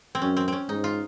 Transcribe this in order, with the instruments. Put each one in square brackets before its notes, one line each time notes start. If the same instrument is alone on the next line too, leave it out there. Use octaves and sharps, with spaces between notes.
[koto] C4
[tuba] F#2 [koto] C#4
[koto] C4
C4 C#4
[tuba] G#2 [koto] D#4
[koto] F4